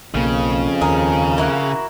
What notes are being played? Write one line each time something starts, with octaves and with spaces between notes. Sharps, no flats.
B1 F2 C#3 A#3
D#2 G#4 A#4
A#3 E4 F#4